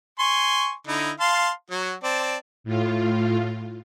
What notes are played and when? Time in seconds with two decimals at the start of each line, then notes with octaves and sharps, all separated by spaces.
0.19 G#5 C6 C#6
0.87 D3 D#4 E4
1.20 F5 A5 C6
1.70 F#3 F#4
2.04 C4 D5 A5
2.64 A2 F4